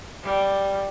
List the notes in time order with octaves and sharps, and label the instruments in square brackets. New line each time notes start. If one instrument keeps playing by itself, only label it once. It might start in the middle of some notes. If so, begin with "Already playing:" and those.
[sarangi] G3